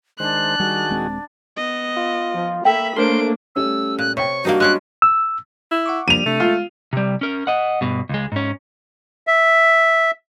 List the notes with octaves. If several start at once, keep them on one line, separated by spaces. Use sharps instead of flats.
D#3 G#3 D4 C5 F#6
D#3 G3 F#4 G#4
D#1 G#3 C4
B3 D#5
F4
F3
A#3 A4 E5 G5 B5
A3 A#3 D4 A#4 C5 C#5 C6 D7
G3 A3 C#4 E6
A#2 F#6
C3 C#5 G5 C#6
G2 A#3 D4 D#4 F#4 A#4
G#3 C#4 D4 F#6
E6
E4
F#5 C#6 D6
F3 G3 A#3 D4 D#7 F7
C3 A3 D4
G#3 F4
C3 G3
C#4 A#4
D#5 F#5
G2 B2
C#2 G#3
G#2 C#4
E5